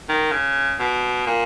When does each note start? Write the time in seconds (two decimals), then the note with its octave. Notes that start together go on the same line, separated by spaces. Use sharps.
0.09 D#3
0.32 C#3
0.80 B2
1.27 A#2